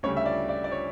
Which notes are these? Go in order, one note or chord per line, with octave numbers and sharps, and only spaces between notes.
D2 C#3 G3 C#5
E5
D5
D5
D5
C#5